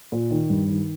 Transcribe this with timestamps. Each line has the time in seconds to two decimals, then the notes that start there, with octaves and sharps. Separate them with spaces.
0.12 A#2
0.31 D#3
0.50 G2
0.68 D#3